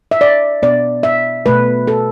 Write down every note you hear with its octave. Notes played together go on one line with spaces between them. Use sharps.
E5
D5
B2 B3 D5
E5
B2 A3 B4
A4